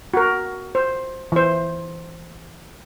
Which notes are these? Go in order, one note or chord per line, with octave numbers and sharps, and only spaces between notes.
F#4 A#4
C5
E3 C5